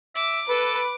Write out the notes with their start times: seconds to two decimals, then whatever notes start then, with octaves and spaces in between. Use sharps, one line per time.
0.15 E5 D6
0.50 A4 B4